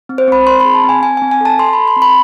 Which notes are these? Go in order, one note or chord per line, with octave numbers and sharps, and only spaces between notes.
C4
C5
C4 B5
C4 C6
G#4 B5
A5
C4 G#5
C4 G#5
C4 G#5
G#5
A4 A5
A4 C6
A4 B5
C6
C4
B5